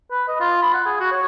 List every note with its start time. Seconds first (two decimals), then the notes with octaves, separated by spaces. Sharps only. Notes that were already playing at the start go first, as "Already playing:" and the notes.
0.11 B4
0.28 D#5
0.40 F4
0.62 B5
0.74 F#5
0.86 G#4
1.00 F#4
1.12 C#5